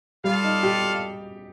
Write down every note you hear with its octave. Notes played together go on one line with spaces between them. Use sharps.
G3 F4 A4 D5 F5
D#4
G4